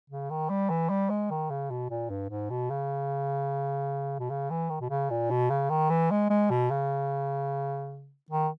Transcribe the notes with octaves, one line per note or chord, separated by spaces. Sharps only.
C#3
D#3
G3
E3
G3
G#3
D#3
C#3
B2
A#2
G2
G#2
B2
C#3
B2
C#3
E3
D#3
B2
C#3
A#2
B2
C#3
D#3
E3
G#3
G#3
B2
C#3
D#3